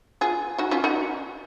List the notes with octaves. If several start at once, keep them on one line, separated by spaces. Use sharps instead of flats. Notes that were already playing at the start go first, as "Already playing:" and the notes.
F4 G#4
D#4 F#4
C#4 F4
D#4 F#4